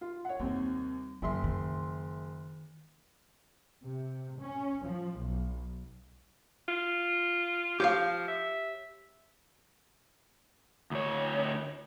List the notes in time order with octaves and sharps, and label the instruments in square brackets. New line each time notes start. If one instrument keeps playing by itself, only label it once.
[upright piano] F4
C#5 F#5
[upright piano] D#2 C3 C4 [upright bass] G3
[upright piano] F#1 E5 C6 [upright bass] D#3 F#3
[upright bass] D#3
[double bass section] C3
C#4
F3
B1
[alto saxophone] F4
[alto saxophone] F3 [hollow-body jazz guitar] G4 C#5 F5
[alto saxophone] E5
[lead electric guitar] D2 C#5